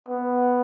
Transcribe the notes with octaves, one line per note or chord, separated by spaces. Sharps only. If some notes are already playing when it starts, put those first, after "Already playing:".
B3